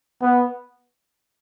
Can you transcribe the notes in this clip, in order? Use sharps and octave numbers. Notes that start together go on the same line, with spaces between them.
B3